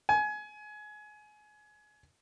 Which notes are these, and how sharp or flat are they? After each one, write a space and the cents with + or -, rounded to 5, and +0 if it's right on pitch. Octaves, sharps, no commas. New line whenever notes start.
G#5 +25